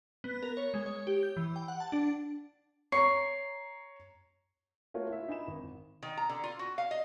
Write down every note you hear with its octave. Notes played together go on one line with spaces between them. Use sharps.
B3
A#4
C#5
G#3
C#5
G4
G6
E3
G5
F#5
A5
D4
C#5 A#5 C#6 C7
A3 A#3 F4 F#4 A#4 C#5
E4 F4 E5
D#4 G#5 B5 E7
G#1
D#3
A#5
D3
F4
F#4
F5
D#5